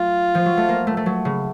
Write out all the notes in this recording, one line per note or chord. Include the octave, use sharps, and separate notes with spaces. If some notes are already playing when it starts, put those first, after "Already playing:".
Already playing: F#3 A3 F4
F3
F#3
A3
A#3
A3
A3
F#3
C#3